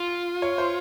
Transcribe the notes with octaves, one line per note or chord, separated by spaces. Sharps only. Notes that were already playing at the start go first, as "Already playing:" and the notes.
Already playing: F4
C#5
C5